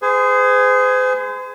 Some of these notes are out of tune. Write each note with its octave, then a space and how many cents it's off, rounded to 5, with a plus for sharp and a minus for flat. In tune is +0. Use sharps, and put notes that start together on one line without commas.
G#4 +0 C5 -40